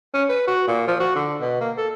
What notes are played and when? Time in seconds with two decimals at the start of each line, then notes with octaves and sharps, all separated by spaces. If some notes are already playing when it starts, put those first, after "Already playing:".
0.14 C#4
0.29 B4
0.47 F#4
0.67 A#2
0.88 F3
1.00 F#4
1.15 D3
1.41 B2
1.61 A#3
1.77 A4